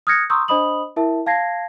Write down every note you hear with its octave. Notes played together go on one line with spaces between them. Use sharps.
D#6 F6 F#6 G#6 A#6 C#7
A#5 C6 C#6 D#6 E6 G6
D4 C5 D#5 B5 D#6 F#7
E4 A#4 E5 A5
F5 A5 G#6 A#6 C7